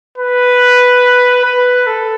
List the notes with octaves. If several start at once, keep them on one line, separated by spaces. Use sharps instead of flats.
B4
B4
A4